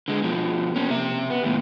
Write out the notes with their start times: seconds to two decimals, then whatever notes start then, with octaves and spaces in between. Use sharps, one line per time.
0.08 D3 G#3
0.24 B2 F3
0.76 A#3 C#4
0.90 C3 E5
1.30 B3
1.43 D#2 A2